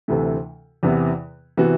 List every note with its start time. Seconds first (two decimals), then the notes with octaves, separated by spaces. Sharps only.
0.08 D2 C3 E3 A3
0.83 E2 C3 E3 B3
1.57 C3 E3 B3 F#4